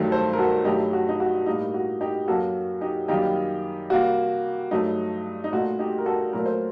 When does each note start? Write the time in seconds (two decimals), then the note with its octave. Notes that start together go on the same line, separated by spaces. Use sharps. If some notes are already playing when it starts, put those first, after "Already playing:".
Already playing: G2 D#3 F#3 A3
0.11 A4 C5
0.33 A#4
0.38 F#4 A4
0.65 G2 F#3 A3 D#4 G4
0.93 F#4
1.09 D#4
1.20 F#4
1.46 A2 G3 A#3 D#4
1.74 F#4
2.01 D#4 G4
2.28 F#2 F#3 A#3 F#4 A4
2.81 D#4 G4
3.08 F#2 D#3 G3 A#3 D#4 G4
3.90 C3 G3 A#3 F#4
4.71 G2 F#3 A3 D#4
5.44 D#4
5.52 A#2 A3 F#4
5.79 D#4 G4
5.98 A#4
6.06 F#4 A4
6.33 A#2 F#3 A3 A#4
6.46 C5